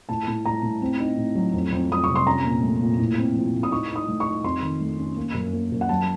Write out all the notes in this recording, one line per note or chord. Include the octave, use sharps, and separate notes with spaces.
A2 A5
A2
A2 A#5
A2
C4
D#4
A2
F#3
F2
F2
F2 D#6
C3 C#6
C6
C#4 A#5
A#2
A3
A#2
A2
C4
F3
A2
D#6
D#4 C#6
D#4
D#6
A3
C#6
D#4
F2 C6
D#3
A3
C#4
A#3
F#2
A#3
F#2
F#5
F#3 A5